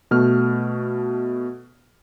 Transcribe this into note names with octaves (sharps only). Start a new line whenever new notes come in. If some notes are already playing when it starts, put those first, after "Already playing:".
B2 A3 F6